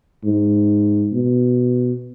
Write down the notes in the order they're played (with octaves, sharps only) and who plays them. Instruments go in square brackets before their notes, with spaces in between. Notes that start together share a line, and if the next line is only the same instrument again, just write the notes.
[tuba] G#2
B2